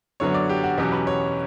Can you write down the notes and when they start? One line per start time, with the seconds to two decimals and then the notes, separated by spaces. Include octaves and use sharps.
0.20 F#2 D3 F#3 B3 C#5
0.34 D5
0.49 G4
0.64 F#4
0.78 E2 B2 F#3 C#4 G4
0.92 B4
1.07 C#5